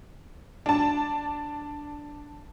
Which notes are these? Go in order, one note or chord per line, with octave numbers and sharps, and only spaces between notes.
D4 A5